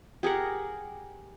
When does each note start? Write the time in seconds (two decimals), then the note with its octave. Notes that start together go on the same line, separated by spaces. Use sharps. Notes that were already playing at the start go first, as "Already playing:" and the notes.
0.23 G4 G#4 A#4 F#5